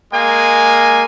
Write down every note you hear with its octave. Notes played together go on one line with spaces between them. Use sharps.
G#3 A#3 G#5